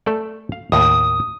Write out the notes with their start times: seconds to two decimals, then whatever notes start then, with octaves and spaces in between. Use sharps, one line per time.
0.06 A3 A4 D5
0.52 F5
0.72 D#2 A2 D#6